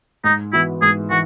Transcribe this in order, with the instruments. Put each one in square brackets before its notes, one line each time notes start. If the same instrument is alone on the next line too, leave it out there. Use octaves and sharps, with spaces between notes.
[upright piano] G#2 [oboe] D#4
[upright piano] E3 B3 F#4 [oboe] E4
[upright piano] G#2 [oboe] G#4
[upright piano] E3 [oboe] F#4